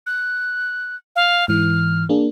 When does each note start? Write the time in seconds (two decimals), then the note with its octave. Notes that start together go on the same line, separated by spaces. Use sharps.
0.06 F#6
1.16 F5
1.48 G#2 E3 F6
2.09 A#3 D4 G#4